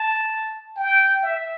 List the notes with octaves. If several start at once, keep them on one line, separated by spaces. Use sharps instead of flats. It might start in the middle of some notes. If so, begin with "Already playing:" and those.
Already playing: A5
G5
E5